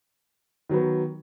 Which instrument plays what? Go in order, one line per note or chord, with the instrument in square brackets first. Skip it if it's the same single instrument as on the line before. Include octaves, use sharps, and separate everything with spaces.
[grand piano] D#3 F#3 B3